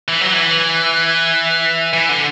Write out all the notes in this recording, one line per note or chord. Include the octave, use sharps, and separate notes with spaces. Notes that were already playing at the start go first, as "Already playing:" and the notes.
E3
F#3
E3
E3
D3